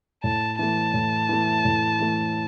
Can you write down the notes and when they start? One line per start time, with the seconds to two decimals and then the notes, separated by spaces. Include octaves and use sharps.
0.24 A2 A5
0.59 E3 A3 A5
0.94 A2
1.29 E3 A3
1.65 A2
2.00 E3 A3